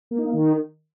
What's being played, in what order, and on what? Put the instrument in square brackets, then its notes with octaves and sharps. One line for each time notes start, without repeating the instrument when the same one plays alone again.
[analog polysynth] A#3
D#4
A#3
D#3